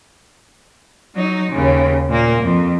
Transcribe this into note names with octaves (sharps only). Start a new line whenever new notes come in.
F#3 D#4
D#2 C#3
A#2 A#3
F2